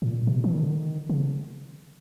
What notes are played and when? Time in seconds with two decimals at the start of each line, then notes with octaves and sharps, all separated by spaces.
0.02 A2
0.11 A#2
0.27 B2
0.44 E3
0.53 D#3
0.62 D3
0.72 D#3
1.09 C#3